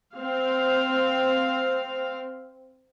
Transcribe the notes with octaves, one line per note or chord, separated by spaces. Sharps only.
C4 F5